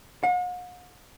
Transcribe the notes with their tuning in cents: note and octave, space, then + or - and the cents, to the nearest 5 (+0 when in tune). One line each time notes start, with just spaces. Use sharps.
F#5 -45